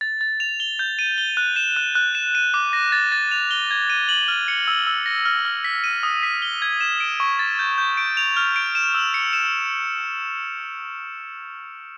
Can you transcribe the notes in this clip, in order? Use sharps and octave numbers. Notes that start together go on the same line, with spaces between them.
A6
A6
F7
G7
G6
D#7
G7
F#6
E7
F#6
F#6
E7
D#7
D6
A#6
A6
A6
F7
G7
G#6
D#7
F#7
F6
C#7
E6
E6
A#6
F6
F6
B6
D#7
D#6
B6
G7
G#6
E7
D7
C#6
A6
G6
G6
D7
F7
F6
D7
E7
E6
C#7
E7